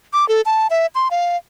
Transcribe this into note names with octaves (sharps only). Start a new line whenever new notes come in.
D6
A4
A5
E5
C6
F5